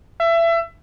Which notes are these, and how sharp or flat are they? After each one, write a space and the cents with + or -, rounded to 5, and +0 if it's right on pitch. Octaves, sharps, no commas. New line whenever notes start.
E5 +25